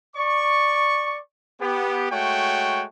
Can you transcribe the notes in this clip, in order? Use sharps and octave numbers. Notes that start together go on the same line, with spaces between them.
D5 C#6
B3 G4
G#3 A3 F#4 C#5 G5